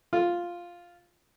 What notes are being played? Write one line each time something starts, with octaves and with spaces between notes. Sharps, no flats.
F4